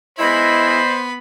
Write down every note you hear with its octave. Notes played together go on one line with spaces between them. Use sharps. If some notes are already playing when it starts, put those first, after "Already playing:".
G#3 B3 E4 C5 D#5 B5